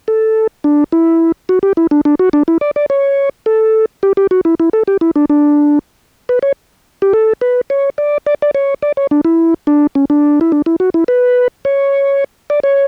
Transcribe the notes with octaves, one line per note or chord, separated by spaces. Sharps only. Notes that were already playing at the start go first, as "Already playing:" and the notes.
A4
D4
E4
F#4
G4
E4
D4
D4
F#4
D4
E4
D5
D5
C#5
A4
G4
G4
F#4
E4
E4
A4
G4
E4
D4
D4
B4
C#5
G4
A4
B4
C#5
D5
D5
D5
C#5
D5
C#5
D4
E4
D4
C#4
D4
E4
D4
E4
F#4
E4
B4
C#5
D5
C#5